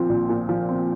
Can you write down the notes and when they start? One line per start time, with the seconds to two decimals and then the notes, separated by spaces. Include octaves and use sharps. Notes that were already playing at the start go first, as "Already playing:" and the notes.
Already playing: A#2 F3 C4
0.09 A#1
0.29 A#2
0.49 F3
0.69 C4